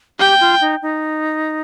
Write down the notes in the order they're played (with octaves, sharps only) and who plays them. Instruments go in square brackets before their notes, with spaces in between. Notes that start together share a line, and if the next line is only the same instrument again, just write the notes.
[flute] G4 [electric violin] G5
[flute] F4
D#4
D#4